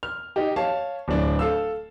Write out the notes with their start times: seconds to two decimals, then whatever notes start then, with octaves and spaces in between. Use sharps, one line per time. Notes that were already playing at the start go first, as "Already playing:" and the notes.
0.03 F6
0.36 D#4 G4
0.56 C#5 F5 A5
1.08 D1 D4
1.39 A4 F5 E6